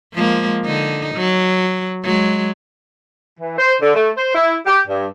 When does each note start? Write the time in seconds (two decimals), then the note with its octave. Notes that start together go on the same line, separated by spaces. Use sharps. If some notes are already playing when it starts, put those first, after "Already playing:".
0.14 F3 G#3 A#3
0.65 D3 D#4
1.15 F#3
2.04 F#3 G#3
3.40 E3
3.58 C5
3.82 D3
3.95 A3
4.17 C5
4.35 E4
4.66 G4
4.88 G2